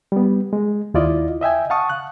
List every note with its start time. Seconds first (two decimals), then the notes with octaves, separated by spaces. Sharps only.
0.12 G3 B3
0.53 G#3
0.94 D#2 E4 F4 D5 D#5
1.41 D#5 E5 G5 G#5
1.70 F5 F#5 A5 C#6 D#6
1.90 F#6